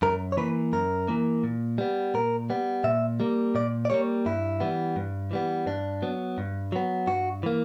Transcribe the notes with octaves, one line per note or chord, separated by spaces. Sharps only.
F#2 A#4
C#5
E3 A#3 B4
F#2 A#4
E3 A#3
A#2
G3 B3
A#2 A#4
G3 B3
A#2 E5
G3 A#3
A#2 D5
D5
G3 A#3 C#5
G2 E4
E3 G3 B3
G2
E3 G3 B3
G2 D4
F#3 B3
G2
F#3 B3
G2 F#4
E3 A#3